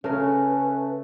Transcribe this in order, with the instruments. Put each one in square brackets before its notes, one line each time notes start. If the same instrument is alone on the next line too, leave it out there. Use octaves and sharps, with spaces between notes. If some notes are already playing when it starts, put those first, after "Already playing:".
[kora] C#3 A#4 [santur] A3 [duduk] C#4 [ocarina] B4